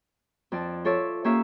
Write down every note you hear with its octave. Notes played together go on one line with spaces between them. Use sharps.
F2 D5 A5
F4 A4 C#5 D5 E5
A#3 C#4 G4 C#5 E5 F5